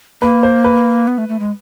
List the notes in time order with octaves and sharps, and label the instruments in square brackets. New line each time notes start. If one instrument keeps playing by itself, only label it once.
[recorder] A#3 [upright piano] B4
[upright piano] C5
B4
[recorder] B3
A3
A3
G#3